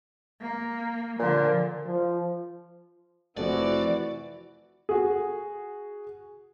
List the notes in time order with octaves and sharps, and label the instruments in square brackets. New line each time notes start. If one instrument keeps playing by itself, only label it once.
[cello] A#3
[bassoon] A#2 [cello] D3 F3
[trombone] F3
[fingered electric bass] F1 F3 [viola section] E3 F#4 [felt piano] A3 C4 [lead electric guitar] D5
[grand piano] F#4 G#4